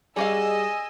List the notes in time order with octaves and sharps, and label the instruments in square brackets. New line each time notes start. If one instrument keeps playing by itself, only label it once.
[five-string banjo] G3 F#4 F5 [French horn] G#4 [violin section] D#5 E6 [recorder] G#5